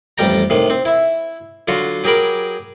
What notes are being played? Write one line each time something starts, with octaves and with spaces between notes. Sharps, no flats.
A1 F2 G3 G5 A#5
A2 C3 D#3
C4
E4 E5
D3 F#3 F4 F#4
F#3 G4 G#4 A#4 B5 D6